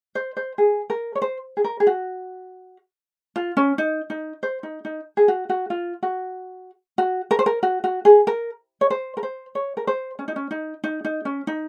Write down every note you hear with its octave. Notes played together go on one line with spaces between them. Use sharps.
C5
C5
G#4
A#4
C#5
C5
G#4
A#4
G#4
F#4
F4
C#4
D#4
D#4
C5
D#4
D#4
G#4
F#4
F#4
F4
F#4
F#4
A#4
C5
A#4
F#4
F#4
G#4
A#4
C#5
C5
A#4
C5
C#5
A#4
C5
C#4
D#4
C#4
D#4
D#4
D#4
C#4
D#4